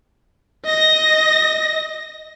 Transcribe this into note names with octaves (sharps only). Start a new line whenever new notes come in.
D#5 A#6